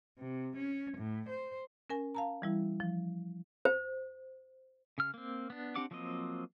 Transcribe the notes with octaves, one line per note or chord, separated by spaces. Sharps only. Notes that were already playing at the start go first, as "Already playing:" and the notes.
C3
C#4
A2
C5
C#4 A#4 G#5
F5 A5 A#5
E3 G3 E4
F3
C5
C#3 F6
A#3 C4
B3 D4
C4 D4 G4 F#5 D6
F3 F#3 A#3 C4 D#5